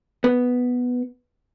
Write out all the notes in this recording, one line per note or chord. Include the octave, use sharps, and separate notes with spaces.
B3